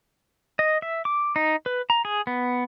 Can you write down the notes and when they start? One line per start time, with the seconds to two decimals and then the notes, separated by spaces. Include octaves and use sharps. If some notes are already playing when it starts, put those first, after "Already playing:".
0.59 D#5
0.82 E5
1.05 D6
1.36 D#4
1.66 B4
1.90 A#5
2.05 G#4
2.27 B3